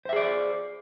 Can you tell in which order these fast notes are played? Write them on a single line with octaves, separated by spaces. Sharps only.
C5 E5 G#4 D5